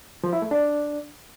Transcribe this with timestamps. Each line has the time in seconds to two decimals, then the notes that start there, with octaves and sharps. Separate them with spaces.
0.24 F3
0.33 E4
0.42 A3
0.51 D4